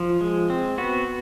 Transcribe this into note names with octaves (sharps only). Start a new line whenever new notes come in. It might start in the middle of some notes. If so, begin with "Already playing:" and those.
Already playing: F3
G#3
C4
B3 F#4